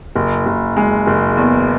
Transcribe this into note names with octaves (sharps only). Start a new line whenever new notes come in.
F#1
F#1
G#3
F#1
E2